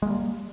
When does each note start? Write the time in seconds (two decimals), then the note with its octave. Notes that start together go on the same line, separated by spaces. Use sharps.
0.02 G#3
0.06 A#3
0.10 G3